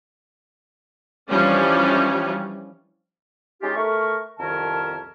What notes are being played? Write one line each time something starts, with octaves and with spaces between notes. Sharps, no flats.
E3 F3 G3 C#4 D4
G#3 C#4 D#4 F4 G4
A3 A#4 C#6
C2 F2 D#3 C#4 A#4 A5